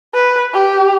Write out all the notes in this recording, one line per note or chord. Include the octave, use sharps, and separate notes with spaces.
B4
G4